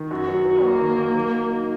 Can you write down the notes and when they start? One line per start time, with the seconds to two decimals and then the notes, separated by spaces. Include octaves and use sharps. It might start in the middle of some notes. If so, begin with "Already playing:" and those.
Already playing: D#3
0.11 F#2 F#4
0.28 F#3
0.45 F#3
0.63 F#3 A#3
0.81 D#3
0.97 D#3
1.15 F#3
1.33 D#4
1.50 D#4